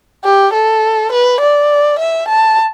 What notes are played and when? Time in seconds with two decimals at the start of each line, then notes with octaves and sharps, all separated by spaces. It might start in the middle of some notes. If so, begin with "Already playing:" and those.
0.24 G4
0.53 A4
1.12 B4
1.40 D5
1.99 E5
2.28 A5